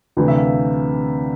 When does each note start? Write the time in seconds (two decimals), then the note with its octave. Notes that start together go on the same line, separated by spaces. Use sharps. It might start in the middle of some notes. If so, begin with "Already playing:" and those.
0.17 D2 C3 E3
0.28 E5
0.36 F5